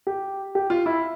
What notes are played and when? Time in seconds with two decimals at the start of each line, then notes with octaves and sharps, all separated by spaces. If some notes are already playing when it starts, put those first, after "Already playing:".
0.07 G4
0.55 G4
0.70 F4
0.86 E4